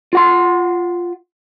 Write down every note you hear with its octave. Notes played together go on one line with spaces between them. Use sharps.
F4 F#5 C6